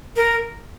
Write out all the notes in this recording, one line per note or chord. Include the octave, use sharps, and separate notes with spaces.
A#4